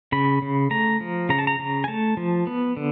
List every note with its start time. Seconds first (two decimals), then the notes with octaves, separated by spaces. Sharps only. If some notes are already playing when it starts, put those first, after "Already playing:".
0.12 C#3 B5
0.42 C#3
0.71 A3 A#5
1.00 F3
1.29 C#3 A#5
1.39 A5
1.47 A#5
1.59 C#3
1.84 G#5
1.88 A3 A5
2.17 F3
2.47 B3
2.77 D3